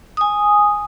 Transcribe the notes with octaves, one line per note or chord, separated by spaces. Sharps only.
G#5 D#6